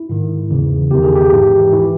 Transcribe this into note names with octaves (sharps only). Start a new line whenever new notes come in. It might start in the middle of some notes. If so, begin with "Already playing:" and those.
Already playing: E4
G#2 D#3
E2 C#3 E3
E2 D#3 G4
G#4
G4
G#2 E3
E3 E4